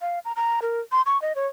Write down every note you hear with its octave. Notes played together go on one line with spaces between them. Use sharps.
F5
A#5
A#5
A#4
C6
C#6
D#5
C#5